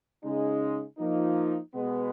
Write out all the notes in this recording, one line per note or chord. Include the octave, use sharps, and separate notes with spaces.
C#3 G#3 D#4
F3 A#3 D#4
B2 G#3 B3